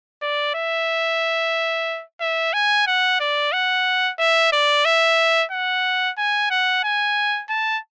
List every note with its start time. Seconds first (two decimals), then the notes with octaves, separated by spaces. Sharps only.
0.22 D5
0.55 E5
2.21 E5
2.54 G#5
2.87 F#5
3.20 D5
3.53 F#5
4.19 E5
4.53 D5
4.86 E5
5.52 F#5
6.18 G#5
6.51 F#5
6.84 G#5
7.50 A5